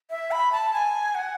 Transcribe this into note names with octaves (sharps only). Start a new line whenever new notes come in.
E5
B5
A5
G#5
F#5